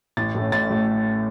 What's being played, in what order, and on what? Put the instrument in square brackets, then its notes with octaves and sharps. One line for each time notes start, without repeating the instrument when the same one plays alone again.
[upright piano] A1 A6
A2 A3 C#4
A1 A6
A2 A3